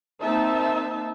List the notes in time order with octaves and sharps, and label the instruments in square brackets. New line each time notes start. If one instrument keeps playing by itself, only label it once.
[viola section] A#3 C4 D#4 E5 A5